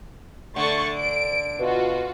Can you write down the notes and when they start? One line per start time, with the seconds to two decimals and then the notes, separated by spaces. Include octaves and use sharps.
0.56 D3 A3 C#6 A6
0.98 D7
1.59 B2 F4 F#4